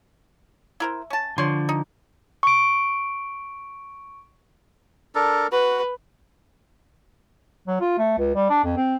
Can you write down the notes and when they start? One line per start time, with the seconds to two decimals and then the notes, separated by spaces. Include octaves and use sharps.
0.80 E4 A#4 C5
1.10 C#4 A5
1.38 D3 F3 C#5 C6
1.69 D#4
2.43 C#6 D7
5.15 D4 A4 A#4
5.52 F#4 B4
7.68 F#3
7.81 F4
7.99 A3
8.18 C#2
8.35 G3
8.50 D4
8.64 F2
8.77 C4